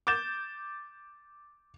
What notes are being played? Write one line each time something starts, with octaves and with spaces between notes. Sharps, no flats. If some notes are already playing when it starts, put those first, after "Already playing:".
D6 G6 A6 E7